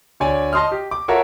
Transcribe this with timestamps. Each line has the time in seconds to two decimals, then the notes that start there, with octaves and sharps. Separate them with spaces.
0.20 D2 C#5 D5 G#5
0.53 D#5 A5 C6 D#6 F6
0.71 G4
0.91 D6
1.08 F4 F#4 A4 A#4 C#5 E5